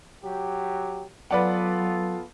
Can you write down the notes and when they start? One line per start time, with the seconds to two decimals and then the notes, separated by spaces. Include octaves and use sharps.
0.22 F#3 G4
1.31 F#3 B3 F4 A4 B4 D5 F#5